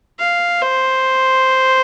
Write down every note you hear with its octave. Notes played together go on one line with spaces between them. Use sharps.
F5
C5